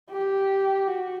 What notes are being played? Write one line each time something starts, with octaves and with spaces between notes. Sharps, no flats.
G4
F#4